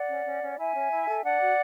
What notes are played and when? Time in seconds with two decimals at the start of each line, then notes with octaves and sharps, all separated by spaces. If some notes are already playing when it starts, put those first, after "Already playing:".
Already playing: D5 F#5
0.08 C#4
0.25 C#4
0.42 C#4
0.58 E4 E5 G#5
0.74 C#4
0.92 E4
1.08 A4
1.24 D4 D5 F#5
1.41 F#4